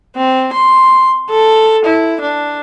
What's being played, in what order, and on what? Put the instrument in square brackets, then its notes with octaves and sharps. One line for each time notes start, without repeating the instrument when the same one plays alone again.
[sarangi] C4
C6
A4
E4
D4